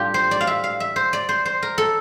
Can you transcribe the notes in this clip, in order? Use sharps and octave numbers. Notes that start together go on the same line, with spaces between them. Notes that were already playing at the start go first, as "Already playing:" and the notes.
Already playing: A2 G3 D4 F4 G4
C5
D5
F5
E5
F5
E5
C5
D5
C5
C5
A#4
A4